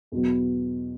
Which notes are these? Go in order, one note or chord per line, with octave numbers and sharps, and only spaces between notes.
E2 B2 F#3 B3